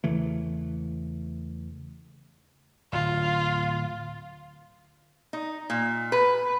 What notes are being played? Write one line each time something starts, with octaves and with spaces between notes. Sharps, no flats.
E2 C#3 E3 A3
D1 F4
D#4
A#2
B4